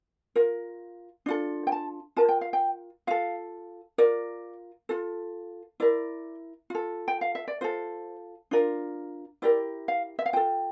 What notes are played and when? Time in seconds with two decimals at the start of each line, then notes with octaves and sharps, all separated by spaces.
0.36 F4 A#4
1.26 D4 F4 A4
1.67 G5
1.72 A5
2.16 F4 A#4 A5
2.29 G5
2.41 F5
2.53 G5
3.07 F4 A4 F5
3.98 F4 A#4 D5
4.89 F4 A4
5.80 E4 A#4 D5
6.70 F4 A4
7.08 G5
7.21 F5
7.35 E5
7.48 D5
7.61 F4 A4 C5
8.51 D4 F4 A#4
9.42 E4 G4 A#4 D5
9.88 F5
10.19 E5
10.26 F5
10.33 F4 A4 G5